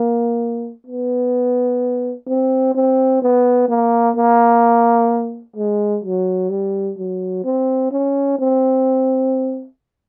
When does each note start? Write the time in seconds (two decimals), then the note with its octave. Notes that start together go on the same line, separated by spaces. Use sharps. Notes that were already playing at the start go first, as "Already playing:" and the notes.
Already playing: A#3
0.87 B3
2.27 C4
2.75 C4
3.22 B3
3.68 A#3
4.16 A#3
5.56 G#3
6.04 F#3
6.50 G3
6.98 F#3
7.44 C4
7.91 C#4
8.39 C4